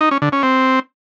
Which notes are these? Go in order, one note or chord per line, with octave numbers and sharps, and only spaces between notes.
D#4
C#4
D3
C#4
C4